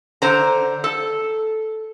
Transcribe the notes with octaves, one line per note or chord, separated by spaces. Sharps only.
D3 C5 A#5
A4